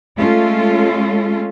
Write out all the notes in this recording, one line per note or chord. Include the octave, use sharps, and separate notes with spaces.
G#3 A3 C#4 F4 A4